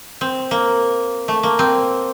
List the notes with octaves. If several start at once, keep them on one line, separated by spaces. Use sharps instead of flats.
C4
A#3
A3
A#3
C4